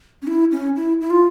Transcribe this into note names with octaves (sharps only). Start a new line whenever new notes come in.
C#4
E4
C#4
E4
E4
F4